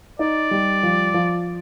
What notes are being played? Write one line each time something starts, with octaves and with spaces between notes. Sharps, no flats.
D#4 D5
G3
F3
F3